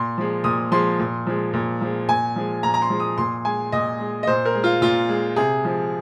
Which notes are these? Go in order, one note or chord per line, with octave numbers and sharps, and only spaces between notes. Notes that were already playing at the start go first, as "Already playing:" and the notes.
Already playing: A#2 C6
F3 G#3
A#2 D#6
F3 G#3 C6
A#2
F3 G#3
A#2
F3 G#3
A#2 G#5
F3 G#3
A#2 A#5
A#5
C6
F3 G#3
D#6
A#2 C6
G#3 G#5
A#2 D#5
G#3
D#5
A#2 C5
A#4
G#3
F4
A#2 F4
G#3
C3 G#4
F3 G#3